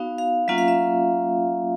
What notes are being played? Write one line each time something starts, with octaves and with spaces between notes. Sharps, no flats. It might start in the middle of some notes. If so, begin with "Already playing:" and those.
Already playing: B3 D#4 F#4 F5
F5
F#3 A#3 C#4 F4 E5
F5
E5